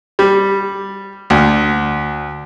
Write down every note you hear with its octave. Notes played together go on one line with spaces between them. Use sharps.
G3
D2